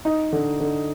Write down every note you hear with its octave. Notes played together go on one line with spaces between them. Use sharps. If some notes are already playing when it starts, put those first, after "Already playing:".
D#4
D3
D3